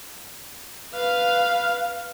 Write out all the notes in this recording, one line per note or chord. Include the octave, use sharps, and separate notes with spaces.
B4 F5